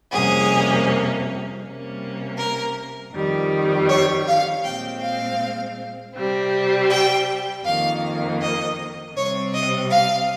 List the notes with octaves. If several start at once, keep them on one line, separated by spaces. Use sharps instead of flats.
F2 C3 G3 A#3 C#4 G#4
C3 G3 A#3 C#4
A#4
F2 D#3 G3
C#5
F5
A#2 G#3 C4 G5
F5
C3 G3 C4
G5
F2 D#3 A#3 F5
D#5
C3 G3 C4 C#5
D#5
F5